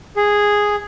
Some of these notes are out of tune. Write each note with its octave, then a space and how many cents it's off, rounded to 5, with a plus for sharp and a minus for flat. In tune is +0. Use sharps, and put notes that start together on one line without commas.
G#4 -5